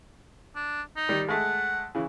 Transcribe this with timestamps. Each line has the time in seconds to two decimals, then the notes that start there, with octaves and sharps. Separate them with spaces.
0.55 D4
0.96 D#4
1.09 D#3 G3
1.28 G#3 A3 F#5
1.95 C#3 E3